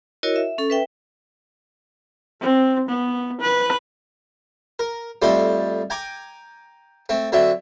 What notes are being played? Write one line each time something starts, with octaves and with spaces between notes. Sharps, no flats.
E4 F#4 A#4 C#5 D#5
E5
C#4 A4
B4 E5 G5
C4
B3
B4
A#4
F2 G3 A3 C5 C6
G5 G#5 A#5 D6
A3 C4
D3 F#3 C4 E5